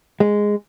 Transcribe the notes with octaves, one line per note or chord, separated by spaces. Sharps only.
G#3